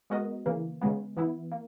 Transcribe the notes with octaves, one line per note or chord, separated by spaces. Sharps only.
G#3 B3 F#4 A#4 D#5
C#3 E3 A#3
C#3 G#3 B3
E3 B3 E4
A#3